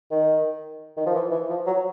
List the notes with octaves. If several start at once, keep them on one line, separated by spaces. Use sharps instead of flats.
D#3
D#3
F3
E3
E3
F3
F#3